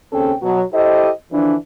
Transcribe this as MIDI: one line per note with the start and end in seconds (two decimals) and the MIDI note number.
0.12 0.32 39
0.12 0.32 49
0.12 0.32 60
0.12 0.32 61
0.12 0.32 69
0.12 0.32 79
0.42 0.63 47
0.42 0.63 54
0.73 1.09 64
0.73 1.09 67
0.73 1.09 69
0.73 1.09 72
0.73 1.09 75
1.32 1.55 50
1.32 1.55 52
1.32 1.55 53
1.32 1.55 62